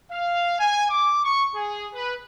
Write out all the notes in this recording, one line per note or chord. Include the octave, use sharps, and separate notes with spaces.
F5
G#5
D6
C#6
G#4
B4